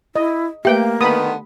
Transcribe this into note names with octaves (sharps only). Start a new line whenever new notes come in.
E4 D#5
A3 A#3 G4 B4 E5 G5
D3 D#3 B3 B5 D#6